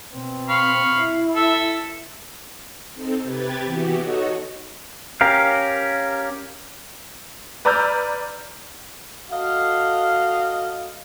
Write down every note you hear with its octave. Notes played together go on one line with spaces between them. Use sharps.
B2 C4
F5 B5 C#6
E4
A4 E5
C4 D#4 A4
C3 G4 B4 G#6 A6
E3 B3 F#4 G4
D#4 F#4 A4 C#5 D#5
C#4 G4 A#4 F5
B4 D5 A#5 E6 F6 G6
F#4 A4 D#5 F5